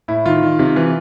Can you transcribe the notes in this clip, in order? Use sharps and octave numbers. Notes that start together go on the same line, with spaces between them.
A2 E4
D#3 F4
D#3
C3
E3